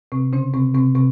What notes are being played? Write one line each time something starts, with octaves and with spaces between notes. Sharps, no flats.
C3 C4
C#3 C#4
C3 C4
C3 C4
C3 C4